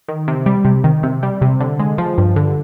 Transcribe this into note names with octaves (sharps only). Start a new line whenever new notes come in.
D#3
C3
G3
C3
D#3
C3
G3
C3
D3
G#3
F3
G2
D3